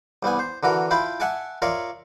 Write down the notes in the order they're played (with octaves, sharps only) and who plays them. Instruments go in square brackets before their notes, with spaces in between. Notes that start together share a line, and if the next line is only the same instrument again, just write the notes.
[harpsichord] C2 G3 B3 G#5
C5
D3 E3 F#4 A#4
E4 F4 G5 A5 B5
E5 F#5 G#5 A5 D6
F4 A#4 C#5 D5 E5